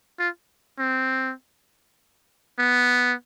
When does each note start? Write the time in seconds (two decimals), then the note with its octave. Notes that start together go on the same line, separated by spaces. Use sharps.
0.19 F4
0.79 C4
2.59 B3